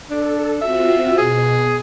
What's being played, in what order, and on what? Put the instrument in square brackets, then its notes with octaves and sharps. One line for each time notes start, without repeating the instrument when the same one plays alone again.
[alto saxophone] D4 [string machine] A4
[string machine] C4 F4 F#4 [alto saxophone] E5
[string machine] B2 [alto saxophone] G#4